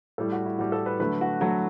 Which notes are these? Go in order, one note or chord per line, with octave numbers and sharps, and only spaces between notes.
A2 G3 A4
F#4
E4
A2 G3 F#4
A4
B4
D3 F#3 A3 B4
F#4
D3 F#3 A3 F#4